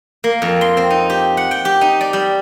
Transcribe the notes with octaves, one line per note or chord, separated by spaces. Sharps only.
A#3
F2
C6
C4
D#4
G4
F#5
G5
G4
D#4
D5
G3